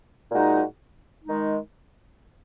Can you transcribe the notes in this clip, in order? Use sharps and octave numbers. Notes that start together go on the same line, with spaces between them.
A#2 G#3 D#4 F#4
D#3 G#3 D#4